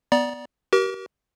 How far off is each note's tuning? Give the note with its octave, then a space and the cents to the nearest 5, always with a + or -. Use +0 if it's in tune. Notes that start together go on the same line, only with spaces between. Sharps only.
B3 +0 D5 +0 A#5 +35
G4 -40 A#4 +30